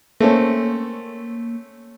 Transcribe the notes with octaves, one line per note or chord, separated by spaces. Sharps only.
A3 A#3 C4 C#4